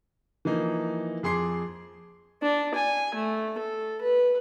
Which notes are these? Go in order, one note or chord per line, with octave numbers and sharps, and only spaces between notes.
E3 F3 A#3 D#4
F2 G#4 C6 D6 C7
D4
G#5
A3
A4
B4